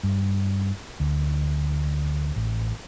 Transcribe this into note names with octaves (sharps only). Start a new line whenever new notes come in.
G2
D2
A1